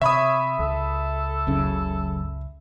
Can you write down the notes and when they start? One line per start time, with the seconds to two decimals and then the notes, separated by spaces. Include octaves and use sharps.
0.02 C3 C#5 E5 B5 D#6
0.59 C#2 A4
1.47 F#1 C#3